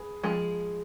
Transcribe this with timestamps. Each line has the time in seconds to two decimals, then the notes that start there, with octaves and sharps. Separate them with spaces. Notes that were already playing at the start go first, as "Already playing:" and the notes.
Already playing: G#4 B4
0.23 F3 G#3